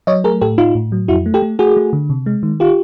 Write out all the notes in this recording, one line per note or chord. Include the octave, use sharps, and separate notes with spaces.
F#3 C#5 D#5
A3 G#4 A#4
A2 G4 A4
A2 D#4 F4
A2
F#3
F2 E4 F#4
A3
G4 A4
A3
A3 F#4 G#4
A3
D3
C3
G#3
D#3
F4 G4